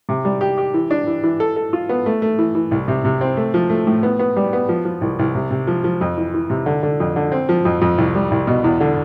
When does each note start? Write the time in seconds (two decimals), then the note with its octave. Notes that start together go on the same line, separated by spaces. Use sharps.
0.09 C3
0.25 G3
0.41 G4
0.58 G4
0.74 E3
0.91 D4
1.07 E3
1.23 E3
1.40 A4
1.56 A4
1.73 F4
1.89 B3
2.06 A3
2.22 A3
2.39 E3
2.55 E3
2.71 C2
2.88 C3
3.05 C3
3.21 C4
3.37 A3
3.54 F3
3.70 A3
3.87 A2
4.03 B3
4.19 B3
4.36 G3
4.53 B3
4.69 F3
4.85 F3
5.01 C2
5.19 C2
5.35 C3
5.51 C3
5.67 F3
5.84 F3
6.01 F2
6.17 E3
6.34 E3
6.50 C3
6.66 D3
6.83 D3
7.00 F2
7.16 D3
7.32 C4
7.49 F3
7.65 F2
7.81 F2
7.98 C2
8.15 G3
8.31 C2
8.47 B2
8.64 E2
8.80 D3